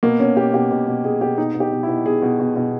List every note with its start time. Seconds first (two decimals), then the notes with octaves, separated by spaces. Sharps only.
0.03 B2 A#3
0.19 B2 C#4
0.37 B2 G4
0.54 B2 G4
0.71 B2
0.88 B2
1.04 B2 G#4
1.21 B2 G4
1.38 B2 D#4
1.54 B2
1.60 G4
1.72 B2
1.83 E4
1.88 B2
2.06 B2 G#4
2.22 B2
2.40 B2
2.56 B2